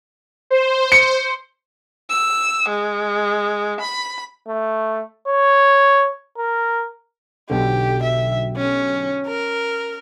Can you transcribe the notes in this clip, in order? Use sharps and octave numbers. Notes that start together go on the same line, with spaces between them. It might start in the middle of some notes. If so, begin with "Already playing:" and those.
C5
C#7
E6
G#3
B5
A3
C#5
A#4
B1 B2 D3 G4
E5
C#4
A#4